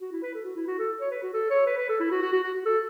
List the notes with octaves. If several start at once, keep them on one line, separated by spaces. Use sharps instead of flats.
F#4
E4
B4
A4
F#4
E4
F#4
A4
C#5
B4
F#4
A4
C#5
B4
B4
A4
E4
F#4
F#4
F#4
F#4
F#4
A4